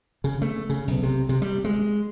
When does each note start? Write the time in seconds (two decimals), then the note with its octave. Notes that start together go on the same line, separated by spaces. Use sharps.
0.24 C#3
0.42 A3
0.69 C#3
0.88 B1
1.03 C3
1.29 C3
1.42 G3
1.64 G#3